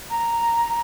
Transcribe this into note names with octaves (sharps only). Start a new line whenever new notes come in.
A#5